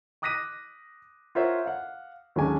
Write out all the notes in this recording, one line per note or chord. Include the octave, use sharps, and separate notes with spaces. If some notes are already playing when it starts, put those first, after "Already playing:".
D6 D#6 F#6 A#6 B6 D#7
F4 A#4 C5 C#5 E5 F#5
F5 F#5
D#2 F#3 G#3 C#4 D4 G#5